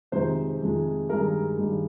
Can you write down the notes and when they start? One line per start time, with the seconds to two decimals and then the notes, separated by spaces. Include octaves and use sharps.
0.12 F2 C3 D#3 G#3 C5
0.61 F2 C3 D#3 G#3
1.09 G2 D#3 G#3 A#4
1.58 G2 D#3 G#3